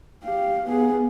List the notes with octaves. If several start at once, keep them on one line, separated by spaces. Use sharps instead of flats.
G4 F5
B3 G#4